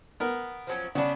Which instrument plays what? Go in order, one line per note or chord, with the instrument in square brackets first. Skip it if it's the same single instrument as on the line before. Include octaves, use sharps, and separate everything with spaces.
[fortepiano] B3 A#4
[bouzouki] F3 F#3 C#4
[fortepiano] C#3 [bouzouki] B3 D4